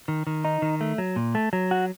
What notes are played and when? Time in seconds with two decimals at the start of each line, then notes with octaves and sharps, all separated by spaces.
0.08 D#3
0.27 D#3
0.45 D#4
0.62 D#3
0.81 A3
0.98 F#3
1.16 A#2
1.35 A3
1.53 F#3
1.71 F#4